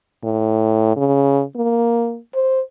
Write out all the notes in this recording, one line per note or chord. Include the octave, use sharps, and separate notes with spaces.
A2
C#3
A#3
C5